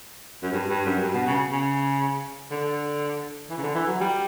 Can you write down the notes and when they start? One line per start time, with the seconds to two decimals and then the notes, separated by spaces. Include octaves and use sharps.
0.43 F#2
0.52 G2
0.69 G2
0.85 F#2
1.02 G2
1.14 B2
1.27 C#3
1.52 C#3
2.51 D3
3.50 E3
3.58 C#3
3.63 D3
3.75 E3
3.87 F#3
4.01 G3